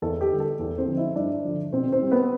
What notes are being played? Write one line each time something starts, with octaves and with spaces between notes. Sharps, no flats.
E2 A4
G4
D3 G3
A4
E2
C4 C5
D3 F3
E4 E5
G2 D4 D5
D3 F3
B2 C4 C5
C4 C5
G3
B3 B4